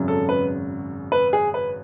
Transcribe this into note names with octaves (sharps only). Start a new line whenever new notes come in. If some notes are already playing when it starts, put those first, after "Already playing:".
Already playing: G#1 F#2 C#3 F#3
A4
B4
B4
G#4
B4